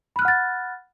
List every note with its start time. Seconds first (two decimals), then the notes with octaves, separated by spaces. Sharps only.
0.16 B5
0.19 F#6
0.22 F6
0.25 F#5
0.28 A6